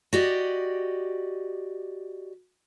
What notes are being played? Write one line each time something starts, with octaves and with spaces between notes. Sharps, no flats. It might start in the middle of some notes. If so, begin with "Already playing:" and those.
F#4 G4 D5 D#5